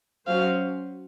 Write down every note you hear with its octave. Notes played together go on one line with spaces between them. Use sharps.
F#3 C#4 F#4 C5 F5